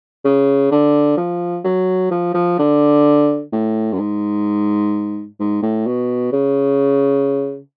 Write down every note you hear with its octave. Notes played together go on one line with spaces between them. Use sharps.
C#3
D3
F3
F#3
F3
F3
D3
A2
F#2
G#2
G#2
A2
B2
C#3